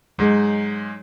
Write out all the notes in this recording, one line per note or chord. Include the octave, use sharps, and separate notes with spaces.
G#2 F#3 G#3 D#4